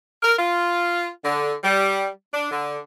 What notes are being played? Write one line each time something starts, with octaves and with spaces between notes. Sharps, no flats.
A#4
F4
D3
G3
D4
D3